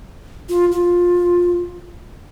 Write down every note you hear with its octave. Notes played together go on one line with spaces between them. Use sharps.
F4
F4